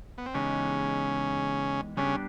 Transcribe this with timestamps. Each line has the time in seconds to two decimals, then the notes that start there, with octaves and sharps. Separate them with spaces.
0.18 B3
0.26 C4
0.34 C#3 E3 G#3 B3 C#4 D#4 G4
1.97 C#3 G3 B3 C#4 D4 G4